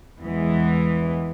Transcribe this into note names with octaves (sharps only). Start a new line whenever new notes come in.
E2 E3 G#3 B3